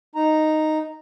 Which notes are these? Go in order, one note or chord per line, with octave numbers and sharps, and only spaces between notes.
D#4 A#5